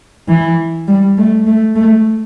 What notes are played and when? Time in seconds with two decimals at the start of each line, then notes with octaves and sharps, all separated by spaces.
0.28 E3
0.87 G3
1.18 A3
1.46 A3
1.75 A3